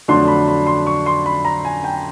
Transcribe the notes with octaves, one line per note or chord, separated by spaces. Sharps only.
F2 D3 F#3 A3 D4 C6
B5
B5
C6
C#6
C6
B5
A#5
G#5
G5